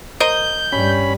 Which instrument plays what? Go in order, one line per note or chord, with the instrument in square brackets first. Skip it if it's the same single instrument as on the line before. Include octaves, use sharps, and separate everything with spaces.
[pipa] A#4 C5 D#5 [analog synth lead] G6
[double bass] G2 G3 [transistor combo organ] C#4 B5